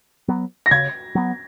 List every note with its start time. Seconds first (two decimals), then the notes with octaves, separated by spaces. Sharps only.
0.28 F#3 B3
0.66 A#6
0.71 C#3 G#6
1.15 F#3 B3